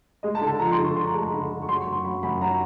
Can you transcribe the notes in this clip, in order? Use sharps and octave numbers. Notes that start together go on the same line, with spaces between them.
G#3 D#5
A5
D3
A5
F3 A#5
C6
D3
C#6
D3 C6
A#5
G#3 A5
A#5
D3 B5
D3
C#6
F#3 C6
C#6
F#2
C6
F#3 B5
F#2 B5
F#3 A#5